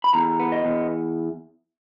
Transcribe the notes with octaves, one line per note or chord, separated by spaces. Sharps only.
B5
E2 A#5
B3
D#5
E2